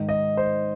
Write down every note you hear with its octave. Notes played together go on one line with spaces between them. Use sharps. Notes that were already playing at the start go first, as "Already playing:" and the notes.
Already playing: G#2 D#3
D#5
C5